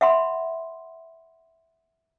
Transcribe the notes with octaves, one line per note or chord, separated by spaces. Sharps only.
E5 F#5 B5 C6